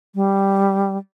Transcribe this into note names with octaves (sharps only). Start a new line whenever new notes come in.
G3